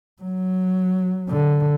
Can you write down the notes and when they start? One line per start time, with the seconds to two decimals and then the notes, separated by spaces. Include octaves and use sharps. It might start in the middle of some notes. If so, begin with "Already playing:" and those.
0.22 F#3
1.29 D3